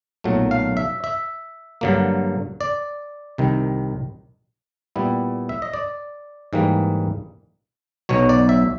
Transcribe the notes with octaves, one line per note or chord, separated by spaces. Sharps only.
B1 A#2 F#3 A3
F5
E5
E5
G2 D3 F#3 A#3
D5
C2 C3 D#3
A#2 G3 B3 E4
E5
D#5
D5
G#2 E3 G3 A#3
B1 B2 F#3 C#5
D5
E5